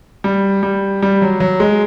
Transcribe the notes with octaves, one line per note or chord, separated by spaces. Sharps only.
G3
G3
G3
F#3
F#3
G#3